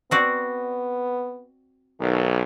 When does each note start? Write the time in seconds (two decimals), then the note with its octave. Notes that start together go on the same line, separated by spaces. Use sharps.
0.11 B3 C4 F#4 D5
2.00 B1 D#3